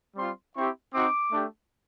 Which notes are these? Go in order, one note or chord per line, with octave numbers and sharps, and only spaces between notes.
G3 C4 F4 C6
C4 E4 G4 C#6
C4 D#4 F#4 D6
A3 D4 G4